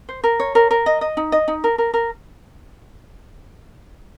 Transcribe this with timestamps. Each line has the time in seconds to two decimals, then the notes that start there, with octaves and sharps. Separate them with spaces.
0.09 C5
0.24 A#4
0.40 C#5
0.55 A#4
0.71 A#4
0.86 D#5
1.01 D#5
1.17 D#4
1.32 D#5
1.48 D#4
1.64 A#4
1.78 A#4
1.94 A#4